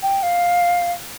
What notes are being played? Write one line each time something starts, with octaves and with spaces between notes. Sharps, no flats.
G5
F5